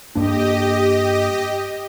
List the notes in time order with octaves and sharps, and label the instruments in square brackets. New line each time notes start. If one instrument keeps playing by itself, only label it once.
[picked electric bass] G2 A#3 D4 [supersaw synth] G4 D#5